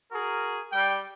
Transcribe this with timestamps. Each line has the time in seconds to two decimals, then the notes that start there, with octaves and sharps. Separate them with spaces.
0.12 F#4 G#4 A#4
0.72 G3 G5